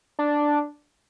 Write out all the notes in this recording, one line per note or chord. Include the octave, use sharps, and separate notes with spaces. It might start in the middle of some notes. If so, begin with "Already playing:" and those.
D4